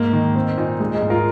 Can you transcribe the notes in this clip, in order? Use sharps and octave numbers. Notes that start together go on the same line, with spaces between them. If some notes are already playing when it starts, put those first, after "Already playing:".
Already playing: G#2 A#3
D#3
A#3 C4
A#2 D#4
G#3 D#4
D#4 G#4
G#2
F4 A#4